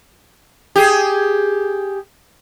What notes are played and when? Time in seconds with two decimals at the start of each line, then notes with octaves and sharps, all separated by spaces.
0.76 G4 G#4